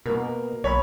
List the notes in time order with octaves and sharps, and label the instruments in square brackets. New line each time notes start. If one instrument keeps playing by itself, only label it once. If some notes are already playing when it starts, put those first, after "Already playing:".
[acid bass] B2 [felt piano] A#3 A#4
[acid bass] B1 [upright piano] C#5 B5